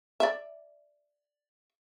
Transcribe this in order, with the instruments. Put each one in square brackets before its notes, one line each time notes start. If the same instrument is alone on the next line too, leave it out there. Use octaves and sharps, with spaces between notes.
[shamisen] D5 E5